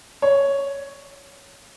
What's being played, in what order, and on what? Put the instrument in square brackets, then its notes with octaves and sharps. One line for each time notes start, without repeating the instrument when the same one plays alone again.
[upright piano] C#5